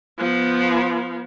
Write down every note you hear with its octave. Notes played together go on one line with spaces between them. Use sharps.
F3 B3